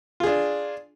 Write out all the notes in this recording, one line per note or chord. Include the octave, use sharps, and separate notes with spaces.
D4 F4 G#4